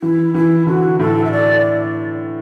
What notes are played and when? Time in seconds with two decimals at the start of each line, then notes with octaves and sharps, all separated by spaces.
0.02 E3 E4
0.34 E3 E4
0.67 D3 F#4
0.99 A2 A4
1.25 E5
1.32 D5